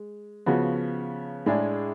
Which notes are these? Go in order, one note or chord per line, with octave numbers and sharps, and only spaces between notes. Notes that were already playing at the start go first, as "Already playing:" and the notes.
Already playing: G#3
C#3 F3 B3 F#4
A2 G#3 D4 G#4